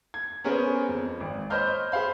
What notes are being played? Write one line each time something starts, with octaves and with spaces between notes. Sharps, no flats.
G#6
B3 C#4 G#4 A#4 C5
F2
G#1
C5 C#5 D#5 B5 F6 G6
G#4 C5 F5 B5